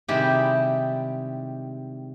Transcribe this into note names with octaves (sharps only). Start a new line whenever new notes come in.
C3 D#3 G3 G#3 E4 G4